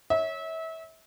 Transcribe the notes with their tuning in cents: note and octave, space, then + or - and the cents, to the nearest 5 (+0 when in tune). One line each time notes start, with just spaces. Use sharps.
C#5 +0 E5 -30